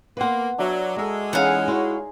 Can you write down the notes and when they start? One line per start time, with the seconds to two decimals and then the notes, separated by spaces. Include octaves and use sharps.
0.17 A#3 B3 B4 F#5 C6
0.58 F#3 D4 E5 A#5
0.96 G#3 F#4 A4 A#5 E6
1.33 E3 C#4 D#4 G#4 F5 F#5
1.68 E4 F#4 C#5 C6